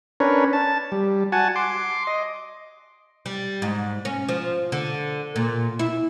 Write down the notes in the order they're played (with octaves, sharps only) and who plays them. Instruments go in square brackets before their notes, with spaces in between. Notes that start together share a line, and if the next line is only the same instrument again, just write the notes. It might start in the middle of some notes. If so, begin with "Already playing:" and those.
[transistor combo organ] C#4 D4 A#4 B4 C#5
A5
G3
F#4 F#5 G#5 A5
C6 D6
D#5
[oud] G3
G#2
C#4
F3
D3
A#2
E4